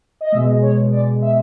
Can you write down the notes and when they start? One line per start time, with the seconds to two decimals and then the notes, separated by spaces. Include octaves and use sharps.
0.21 D#5
0.32 B2 G#3 E5
0.47 D#5
0.62 C#5
0.92 D5
1.22 E5